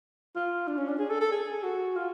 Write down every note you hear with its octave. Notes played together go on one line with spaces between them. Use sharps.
F4
D4
C#4
D4
G#4
A4
A4
G#4
F#4
F4